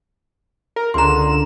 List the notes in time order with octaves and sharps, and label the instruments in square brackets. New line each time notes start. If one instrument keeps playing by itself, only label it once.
[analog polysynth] A#4
[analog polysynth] C#2 D3 E7 [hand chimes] A#5 C6